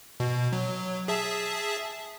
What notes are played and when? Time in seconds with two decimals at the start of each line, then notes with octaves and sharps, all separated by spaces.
0.20 B2
0.53 F#3
1.08 G#4 E5 A5